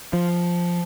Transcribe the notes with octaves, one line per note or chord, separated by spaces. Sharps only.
F3